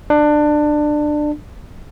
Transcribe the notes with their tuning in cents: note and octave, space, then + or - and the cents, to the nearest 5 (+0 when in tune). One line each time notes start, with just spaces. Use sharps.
D4 +20